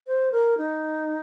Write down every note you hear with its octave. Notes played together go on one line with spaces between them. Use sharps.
C5
A#4
D#4